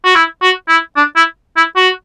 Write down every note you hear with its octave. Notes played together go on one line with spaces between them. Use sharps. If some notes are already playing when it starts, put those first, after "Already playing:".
F#4
E4
F#4
E4
D4
E4
E4
F#4